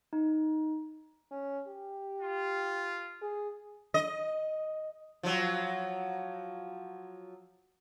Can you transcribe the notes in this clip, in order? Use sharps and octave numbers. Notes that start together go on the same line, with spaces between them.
D#4
C#4
G4
F4
G#4
D#5
F3 F#3